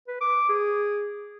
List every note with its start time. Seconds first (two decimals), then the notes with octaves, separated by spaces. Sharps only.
0.08 B4
0.21 D6
0.49 G#4